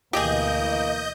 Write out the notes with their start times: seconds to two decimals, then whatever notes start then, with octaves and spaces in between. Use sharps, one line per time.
0.13 D2 B2 E3 A#3 G4 G#4 D#5 G6